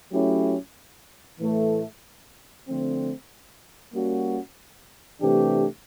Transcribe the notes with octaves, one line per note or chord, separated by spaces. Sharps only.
F#3 A3 C#4 E4 G4
A2 E3 A3
D3 F3 A3 C4
G3 A#3 C#4 F#4
C3 E3 A3 D4 G4